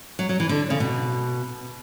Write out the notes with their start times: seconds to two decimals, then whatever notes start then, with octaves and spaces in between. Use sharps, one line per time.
0.19 F#3
0.29 F#3
0.40 E3
0.49 D3
0.70 C#3
0.80 B2